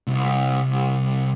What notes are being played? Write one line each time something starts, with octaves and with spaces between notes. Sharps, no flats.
C2